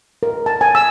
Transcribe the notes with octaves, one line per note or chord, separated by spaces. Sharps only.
A#4
A5
G#5
E6